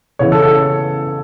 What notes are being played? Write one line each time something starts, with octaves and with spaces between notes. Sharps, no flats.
C#3 E3 B3 E4 C#5
A4
A4